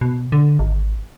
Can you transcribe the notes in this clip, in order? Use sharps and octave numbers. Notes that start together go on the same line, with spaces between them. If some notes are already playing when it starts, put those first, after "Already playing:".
B2
D3
G#1